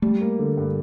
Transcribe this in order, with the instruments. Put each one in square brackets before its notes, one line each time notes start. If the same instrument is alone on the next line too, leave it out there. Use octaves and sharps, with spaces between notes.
[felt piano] G3 [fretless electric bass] A3
[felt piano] A#3
D3
G2